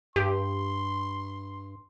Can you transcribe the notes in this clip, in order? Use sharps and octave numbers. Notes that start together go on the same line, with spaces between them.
G2 G4 C6